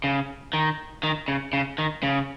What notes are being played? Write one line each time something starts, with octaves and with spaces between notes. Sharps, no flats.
C#3
D#3
D#3
C#3
C#3
D#3
C#3